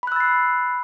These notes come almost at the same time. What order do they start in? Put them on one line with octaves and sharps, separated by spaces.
B5 F#6 E6 A6 C7